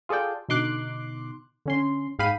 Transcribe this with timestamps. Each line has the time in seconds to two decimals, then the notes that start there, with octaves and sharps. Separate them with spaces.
0.09 F4 G#4 A4 D5 G5
0.48 B2 D3 D#4 C6 D6 F#6
1.66 D3 C#4 C6
2.19 G#2 G#3 F5 G5 B5 D#7